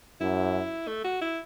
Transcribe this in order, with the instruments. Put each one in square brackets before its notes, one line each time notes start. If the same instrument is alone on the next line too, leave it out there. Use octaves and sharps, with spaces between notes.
[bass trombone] F#2 [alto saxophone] E4
[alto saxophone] A3
F#4
E4